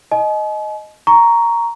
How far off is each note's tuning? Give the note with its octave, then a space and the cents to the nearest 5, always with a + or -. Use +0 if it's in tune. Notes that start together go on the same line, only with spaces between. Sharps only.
D#5 +0 G#5 +45
A#5 +0 C#6 +15